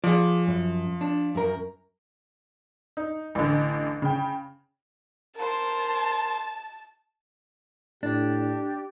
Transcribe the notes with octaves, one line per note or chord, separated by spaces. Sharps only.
F3 G#4 D5
F#2
D4
F#2 A#4
D#4
A1 D3
C#3 G5
A#4 C5 A5
A2 D4 G4